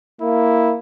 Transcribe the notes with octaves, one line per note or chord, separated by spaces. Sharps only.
A#3 E4